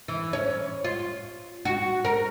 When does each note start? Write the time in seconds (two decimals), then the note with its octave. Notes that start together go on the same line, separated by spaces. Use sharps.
0.08 E3
0.33 C#4
0.85 F4
1.65 F#4
2.05 A#4